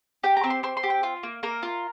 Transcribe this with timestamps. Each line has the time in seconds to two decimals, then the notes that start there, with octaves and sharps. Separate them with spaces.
0.23 G4 G5
0.37 A#5
0.44 C4
0.50 C6
0.63 C4 C6
0.77 C6
0.83 G4
0.90 G5
1.03 F4
1.23 A#3
1.43 A#3 A#4
1.63 F4